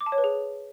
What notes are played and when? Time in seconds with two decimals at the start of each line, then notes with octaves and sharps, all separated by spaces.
0.01 D6
0.06 A5
0.12 C#5
0.18 B4
0.24 G#4